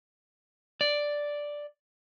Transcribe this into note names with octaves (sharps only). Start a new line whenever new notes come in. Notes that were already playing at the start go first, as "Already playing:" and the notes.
D5